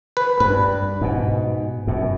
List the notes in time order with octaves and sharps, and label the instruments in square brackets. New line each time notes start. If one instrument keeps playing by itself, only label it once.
[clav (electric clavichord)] B4
[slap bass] G2 [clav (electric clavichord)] B4
[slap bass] G#2 B2
F#2 B2